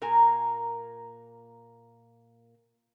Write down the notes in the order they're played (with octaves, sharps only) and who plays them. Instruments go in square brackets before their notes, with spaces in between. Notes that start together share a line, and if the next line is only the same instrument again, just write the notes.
[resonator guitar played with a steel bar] A#2 A#3 A#4 G#5